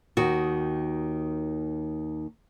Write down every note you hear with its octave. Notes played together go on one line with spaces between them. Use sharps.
D#2 D#3 F#4